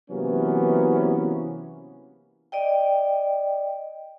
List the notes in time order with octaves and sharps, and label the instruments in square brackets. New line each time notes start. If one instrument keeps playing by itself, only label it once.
[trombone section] C3 E3 F#3 A#3 B3 C#4
[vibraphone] D5 D#5 G5